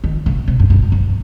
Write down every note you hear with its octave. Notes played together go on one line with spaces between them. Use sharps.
D#3
C#3
C3
G2
G2
F2